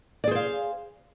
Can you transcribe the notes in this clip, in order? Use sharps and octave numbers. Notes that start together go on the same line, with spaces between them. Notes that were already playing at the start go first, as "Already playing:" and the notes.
G#4 C5 D5 F5